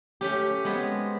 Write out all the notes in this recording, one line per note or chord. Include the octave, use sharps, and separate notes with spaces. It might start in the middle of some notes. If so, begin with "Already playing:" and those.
A3 C#4 G4
G#3 B3 C4